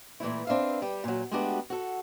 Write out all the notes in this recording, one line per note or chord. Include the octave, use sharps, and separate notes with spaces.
A#2 E3 A3 E4
C4 D4 B4 E5 F5
G3 G4
A#2 F#3
G#3 A3 B3 D4 F#4 G4
F#4 A4